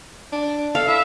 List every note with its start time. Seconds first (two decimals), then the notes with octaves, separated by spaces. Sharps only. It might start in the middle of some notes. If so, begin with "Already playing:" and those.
0.32 D4
0.75 A4 F5
0.88 E4 E5